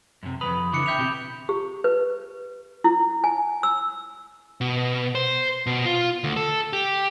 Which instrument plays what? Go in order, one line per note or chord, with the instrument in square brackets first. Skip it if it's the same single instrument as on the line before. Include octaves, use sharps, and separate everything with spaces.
[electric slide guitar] F#2 C3
[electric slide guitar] F2 D#3 B4 [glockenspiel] B5 D#6
[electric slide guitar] C#3 E3 D4 [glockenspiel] D6 C#7
[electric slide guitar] D3 E5 G5 [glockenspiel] G6 F7
[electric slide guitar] B2 C4 G4
[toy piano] G4
B4
E4
G#5
E6
[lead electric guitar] B2
C5
B2
F4
D2
A4
G4